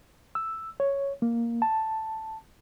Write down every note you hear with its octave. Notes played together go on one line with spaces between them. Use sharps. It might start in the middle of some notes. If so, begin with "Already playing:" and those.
E6
C#5
A#3
A5